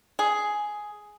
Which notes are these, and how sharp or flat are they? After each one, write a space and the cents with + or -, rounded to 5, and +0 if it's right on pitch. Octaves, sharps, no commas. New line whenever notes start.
G#4 +5